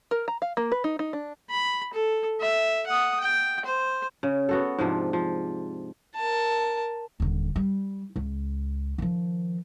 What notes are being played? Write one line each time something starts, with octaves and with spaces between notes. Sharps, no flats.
A#4
A#5
F5
A#3
B4
D#4
D#4
D4
B5
A4
E5
F#5 D#6
G5
C5
C#3
B3 F#4 A4
G#2 C3 F3 D4
F3
A#4 A5
D#1 D3
G3
C#2
D#3 F3